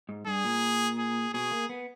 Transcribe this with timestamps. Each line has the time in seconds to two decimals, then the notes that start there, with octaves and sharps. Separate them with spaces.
0.09 G#2
0.27 G2 G#4
0.45 A#2
0.98 G#4
1.34 B2 G#4
1.51 A#3
1.70 B3